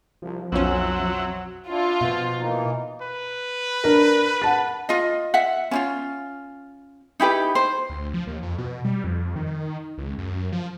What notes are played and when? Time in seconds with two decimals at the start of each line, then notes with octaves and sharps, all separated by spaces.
0.22 C2 F3
0.52 B1 F2 F#3 C4 C#4 E5 F#5
1.68 D4 E4 F4
2.01 B2 F3 B3
2.38 E3 A#3 D#4
3.02 B4
3.84 D4 A#4
4.42 F#5 A5 A6
4.89 F4 D#5
5.34 E5 F#5
5.71 C#4 E4 F4
7.20 D#4 E4 G4 B4
7.55 C5
7.90 D2
8.14 F3
8.27 D#2
8.43 F2
8.58 B2
8.85 G3
9.04 F2
9.36 D#3
9.98 C#2
10.18 F#2
10.52 F3